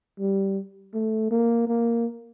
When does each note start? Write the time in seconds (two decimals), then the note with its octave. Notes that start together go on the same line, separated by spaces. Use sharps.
0.19 G3
0.94 A3
1.31 A#3
1.68 A#3